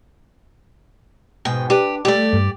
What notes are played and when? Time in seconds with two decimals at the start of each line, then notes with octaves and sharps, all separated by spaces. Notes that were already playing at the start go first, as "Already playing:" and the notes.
1.45 G#2 B2 G5
1.70 D4 G4 B4
2.05 G3 A3 G4 D5
2.33 G2